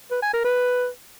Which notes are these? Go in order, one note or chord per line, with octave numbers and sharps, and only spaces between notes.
B4
G#5
A#4
B4